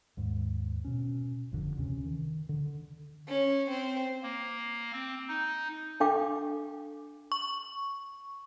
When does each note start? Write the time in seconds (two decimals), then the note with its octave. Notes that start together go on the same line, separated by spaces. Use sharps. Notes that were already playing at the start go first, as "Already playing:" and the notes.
0.17 D#2 G#2
0.85 B2 C#4
1.52 G1 F2 D3
1.77 D2 C3 E3 C#4
2.05 D#3
2.49 D3
3.29 C#4
3.70 C4
4.23 A#3
4.93 C4
5.28 D#4
6.00 D4 A4 F5 G5 D6
7.32 C#6